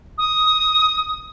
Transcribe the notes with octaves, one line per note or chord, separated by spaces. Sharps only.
D#6